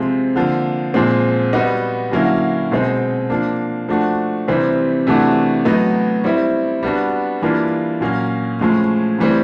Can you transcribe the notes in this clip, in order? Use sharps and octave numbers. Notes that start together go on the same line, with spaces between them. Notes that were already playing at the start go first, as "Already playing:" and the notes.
Already playing: C3 F3 G#3 C4 F4
D3 F3 A#3
A#2 F3 G#3 C4
G3 B3 D#4 F#4
D3 F#3 A#3 C#4 E4
B2 G#3 C4 D#4
F3 A#3 D4
F3 A3 D4 F#4
C3 E3 G3 C4
C3 E3 A3 D4 F#4
A2 F#3 B3 D#4
G3 C4 E4
G3 B3 D4 F#4
E3 G3 A#3 D4 F4
A#2 F#3 A#3 C#4
A2 F3 G#3 C#4
A2 E3 G3 C4